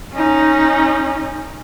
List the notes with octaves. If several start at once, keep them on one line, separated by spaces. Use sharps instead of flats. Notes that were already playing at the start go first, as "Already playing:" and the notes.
C#4 D#4